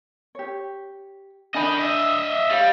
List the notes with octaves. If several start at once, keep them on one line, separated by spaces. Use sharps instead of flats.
G4 C#5
D4 D#5 G5 G#5 B5
D#5 E5
G3 C#5 D#5 F5